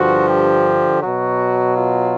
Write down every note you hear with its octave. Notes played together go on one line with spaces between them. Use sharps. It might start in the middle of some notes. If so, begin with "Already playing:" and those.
Already playing: G2 D3 F3 F#4
G4
B2 F#3 F#4
F4